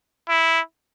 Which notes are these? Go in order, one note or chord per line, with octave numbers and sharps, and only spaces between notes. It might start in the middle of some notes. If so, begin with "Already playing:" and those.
E4